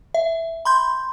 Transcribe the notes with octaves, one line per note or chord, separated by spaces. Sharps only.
E5
B5 C6 G6